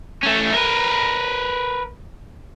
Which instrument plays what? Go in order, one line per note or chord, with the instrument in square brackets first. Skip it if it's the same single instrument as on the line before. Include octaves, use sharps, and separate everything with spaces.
[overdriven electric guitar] A3 C#4
A#4 B4